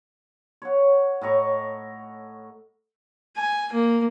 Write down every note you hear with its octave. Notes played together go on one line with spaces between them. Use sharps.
C#5 F#5
A2 D#5 A#5 C#6
G#5
A#3